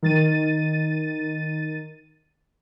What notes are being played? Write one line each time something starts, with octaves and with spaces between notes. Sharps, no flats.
D#3 A6 D#7